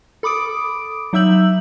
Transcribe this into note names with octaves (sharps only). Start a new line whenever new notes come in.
A4 B5 D6 D#6 D7
F#3 D#4 E5 E6 G6 F#7